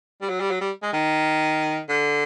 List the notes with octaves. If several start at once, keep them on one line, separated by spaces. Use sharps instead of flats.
G3
F#3
G3
F#3
G3
G#3
D#3
D3